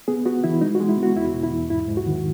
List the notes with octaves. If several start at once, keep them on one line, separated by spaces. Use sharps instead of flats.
B3 G#4
B3 F#4
E3 E4
G#3 D#4
F#4
G#3
E4
B3
F#4
E2 E4
B2
E4
E2
G#2 E4
G#2
F#4
D#3